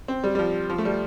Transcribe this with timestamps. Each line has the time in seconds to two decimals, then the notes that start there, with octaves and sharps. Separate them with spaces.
0.08 C4
0.24 G3
0.35 G3
0.39 F3
0.70 F3
0.78 A3
0.85 G3